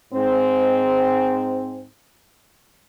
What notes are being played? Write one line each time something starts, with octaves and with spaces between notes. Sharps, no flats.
G#2 C4